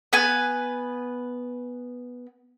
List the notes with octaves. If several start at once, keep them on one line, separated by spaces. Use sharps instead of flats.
B3 B4 G#5